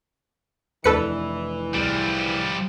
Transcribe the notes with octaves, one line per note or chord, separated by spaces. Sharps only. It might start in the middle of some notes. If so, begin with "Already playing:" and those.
F1 E3 D4 A4 B4 C#7
C2 F3 G3 G#4